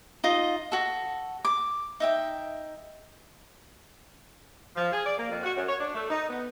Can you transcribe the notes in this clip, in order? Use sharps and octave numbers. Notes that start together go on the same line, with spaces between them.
D#4 F4 D#5
F#4 A4
D6
D#4 E5 G5
F3
G#4
D5
A#3
F2
F#4
F#2
C#5
D4
A3
D#4
B3